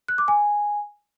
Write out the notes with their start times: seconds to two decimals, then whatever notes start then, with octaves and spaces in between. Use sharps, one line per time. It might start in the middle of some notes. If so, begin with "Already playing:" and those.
0.08 F#6
0.18 D6
0.28 G#5